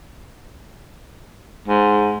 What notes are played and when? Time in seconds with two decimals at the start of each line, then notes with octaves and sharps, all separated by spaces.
1.68 G#2